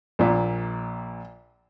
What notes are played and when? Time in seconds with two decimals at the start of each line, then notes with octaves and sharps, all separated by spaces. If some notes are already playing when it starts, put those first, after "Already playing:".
0.19 A#1 A#2